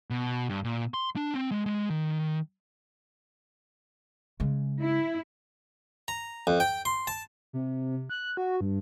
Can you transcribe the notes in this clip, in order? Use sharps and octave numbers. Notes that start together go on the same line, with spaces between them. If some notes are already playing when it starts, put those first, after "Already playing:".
B2
G2
A#2
C6
D4
C4
G#3
G#3
D#3
C#3 G#3
E4
A#5
F2
G5
C6
A5
C3
F#6
F#4
G2